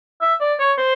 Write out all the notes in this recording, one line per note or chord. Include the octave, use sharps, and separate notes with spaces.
E5
D5
C#5
C5